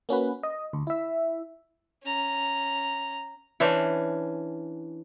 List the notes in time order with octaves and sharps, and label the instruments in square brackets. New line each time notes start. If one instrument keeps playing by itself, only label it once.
[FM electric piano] A#3 C#4 F#4 B4
D#5
D2
E4 E5
[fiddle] C#4 A#5
[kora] E3 C#4 D4 C5